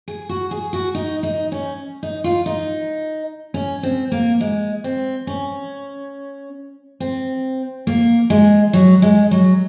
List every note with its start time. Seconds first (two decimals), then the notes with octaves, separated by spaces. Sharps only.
0.08 G#4
0.29 F#4
0.51 G#4
0.73 F#4
0.95 D#4
1.23 D#4
1.52 C#4
2.03 D#4
2.24 F4
2.46 D#4
3.54 C#4
3.83 C4
4.12 A#3
4.41 G#3
4.84 C4
5.27 C#4
7.00 C4
7.87 A#3
8.30 G#3
8.73 F#3
9.02 G#3
9.31 F#3